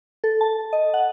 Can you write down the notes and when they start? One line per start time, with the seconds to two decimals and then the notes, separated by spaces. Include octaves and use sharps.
0.24 A4
0.41 A5
0.73 D#5
0.94 F#5